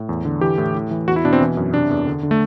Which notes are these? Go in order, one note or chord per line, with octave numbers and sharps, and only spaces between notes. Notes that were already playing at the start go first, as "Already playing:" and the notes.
Already playing: A2
E2
D3
E3 G4
A2
A2
E3
E2 F#4
E4
B2 D4
C4
E3
F#2
C3 D4
E2
D3
D3
A3